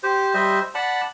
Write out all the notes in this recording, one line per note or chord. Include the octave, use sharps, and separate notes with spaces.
G4 C5
G3 C5 D#5 E5
D5 F#5 A5 B5